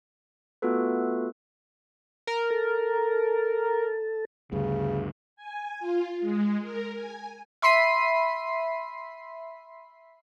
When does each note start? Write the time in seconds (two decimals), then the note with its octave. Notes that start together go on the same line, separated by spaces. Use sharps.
0.62 A3 B3 F4 F#4 A4 B4
2.27 A#4
2.50 A4
4.52 D2 G2 C#3
5.36 G#5
5.79 F4
6.21 G#3
6.62 A#4
6.94 G#5
7.62 E5 B5 C6 B6 C7 D#7